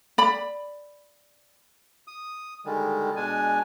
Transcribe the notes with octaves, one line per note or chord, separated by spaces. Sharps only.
D5 B5
D#6
D3 D#3 G3 G#3
B2 G#3 D4 G#5